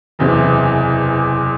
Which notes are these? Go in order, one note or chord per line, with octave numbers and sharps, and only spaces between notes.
F#1 E2 C3 E3